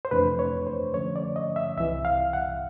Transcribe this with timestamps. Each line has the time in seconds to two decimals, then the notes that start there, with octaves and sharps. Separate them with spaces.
0.05 C5
0.11 F2 C3 E3 A3 D4 B4
0.39 C#5
0.67 C5
0.94 D3 F3 A3 C#4 C#5
1.16 D5
1.36 D#5
1.56 E5
1.77 C2 C3 E3 E5
2.05 F5
2.33 F#5